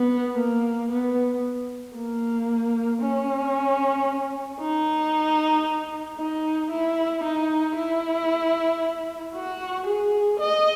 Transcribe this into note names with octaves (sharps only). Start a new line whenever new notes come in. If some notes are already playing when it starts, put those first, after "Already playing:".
Already playing: B3
A#3
B3
A#3
C#4
D#4
D#4
E4
D#4
E4
F#4
G#4
D#5